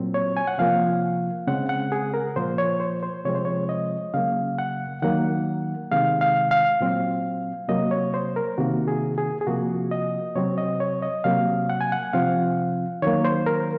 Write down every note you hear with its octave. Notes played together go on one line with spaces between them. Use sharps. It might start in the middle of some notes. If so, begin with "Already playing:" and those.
Already playing: A#2 F#3 C4
C#5
G#5
F#5
C3 F3 A#3 F5
C#3 G#3 C4 F#5
F#5
G#4
A#4
A#2 F3 A#3 C5
C#5
C5
C5
C3 F3 G#3 C4 C#5
C5
C#5
D#5
C#3 F#3 A#3 F5
F#5
D#3 F#3 A#3 F#5
C3 D#3 G#3 F5
F5
F5
A#2 F#3 C4
C3 F#3 A#3 D#5
C#5
C5
A#4
C3 D#3 A#3 F#4
G#4
G#4
G#4
C3 F3 A#3 F#4
D#5
C3 F#3 C4 C#5
D#5
C#5
D#5
C3 F#3 A#3 F5
F#5
G#5
F#5
C3 F3 C4 F5
D#3 F#3 A#3 C#5
C5
A#4